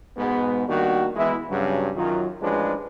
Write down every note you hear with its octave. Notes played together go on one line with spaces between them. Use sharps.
G#2 B2 G#3 B3
D#3 G3 A#3 D4 F#4
E3 G#3 B3 E4
G2 C#3 F#3
F#2 D#3 F#3 F4
A1 F3 G#3 C#4 D4 B4